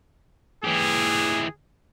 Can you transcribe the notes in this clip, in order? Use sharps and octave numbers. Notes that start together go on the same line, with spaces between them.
E3 G4 G#4